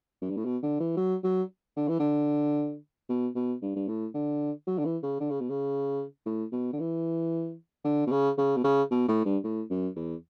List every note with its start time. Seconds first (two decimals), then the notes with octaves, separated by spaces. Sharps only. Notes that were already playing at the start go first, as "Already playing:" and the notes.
0.21 F#2
0.29 G2
0.37 A2
0.45 B2
0.62 D3
0.79 E3
0.96 F#3
1.23 F#3
1.76 D3
1.88 E3
1.99 D3
3.09 B2
3.35 B2
3.62 G2
3.75 G2
3.88 A2
4.14 D3
4.67 F#3
4.78 D3
4.85 E3
5.02 C#3
5.20 D3
5.30 C#3
5.40 B2
5.49 C#3
6.26 A2
6.52 B2
6.73 D3
6.79 E3
7.84 D3
8.07 B2
8.11 C#3
8.37 C#3
8.56 B2
8.64 C#3
8.91 B2
9.08 A2
9.25 G2
9.43 A2
9.70 F#2
9.96 E2